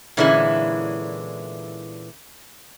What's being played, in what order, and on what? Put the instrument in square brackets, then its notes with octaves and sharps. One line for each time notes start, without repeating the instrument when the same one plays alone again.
[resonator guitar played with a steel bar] A#2 D3 E3 G#3 C#4 E4